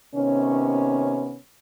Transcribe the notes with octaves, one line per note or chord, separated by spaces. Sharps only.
C3 D#3 B3 C#4